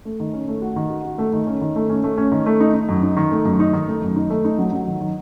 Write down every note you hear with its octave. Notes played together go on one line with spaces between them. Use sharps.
A3
D#3
C#4
A3
F#4
D#3
F#4
F#4
A3
D#3
C#4
D#3
A3
C#4
A3
C#4
D#3
A3
D#4
D#4
F#2
D#4
D#3
A3
F#2
D#4
D#3
A3
F#2
D#4
A3
D#4
F#3
F#3
D#3
D#3